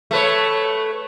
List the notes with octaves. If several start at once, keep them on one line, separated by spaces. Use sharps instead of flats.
A3 B4 C#5